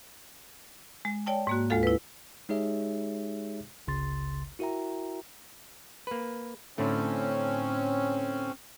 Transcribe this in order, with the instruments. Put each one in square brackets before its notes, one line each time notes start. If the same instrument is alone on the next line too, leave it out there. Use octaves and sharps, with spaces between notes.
[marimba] G#3
C#5 D5 G5 A5
G#2 A#3 F#4
D2 G#3 F4 A4 F5
E4 B4
[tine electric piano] G#3 D#4 G4 G#4 C#5 E5
G1 C#2 C#3 C6 A6
E4 F#4 A#4 E5 G5 A#5
[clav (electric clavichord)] A#3 B4
[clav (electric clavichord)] A2 D3 A3 [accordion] C4 C#4